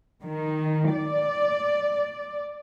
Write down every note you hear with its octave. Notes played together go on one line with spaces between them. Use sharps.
D#3
D5